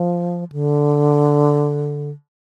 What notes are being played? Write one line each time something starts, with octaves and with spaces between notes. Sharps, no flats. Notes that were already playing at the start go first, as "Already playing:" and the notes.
Already playing: F3
D3